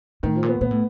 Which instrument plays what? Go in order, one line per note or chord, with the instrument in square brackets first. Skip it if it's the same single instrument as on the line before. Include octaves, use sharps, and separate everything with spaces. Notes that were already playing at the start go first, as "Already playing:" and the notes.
[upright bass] A2 [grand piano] D#3
[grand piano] F3
[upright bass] A#2
[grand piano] B3
[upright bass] A#2 [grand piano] B3
[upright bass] A2